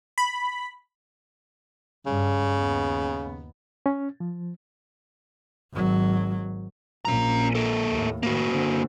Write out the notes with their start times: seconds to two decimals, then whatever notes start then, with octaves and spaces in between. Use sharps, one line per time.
0.18 B5
2.06 G2 C#3
2.58 D#2 B3
3.86 C#4
4.20 F3
5.73 G#1 F#3
7.05 A#1 A#2 C#4 A#5
7.55 A#3 A4
7.90 D#2 A2
8.23 A2 D#3 A#3 F#4
8.51 D3 C4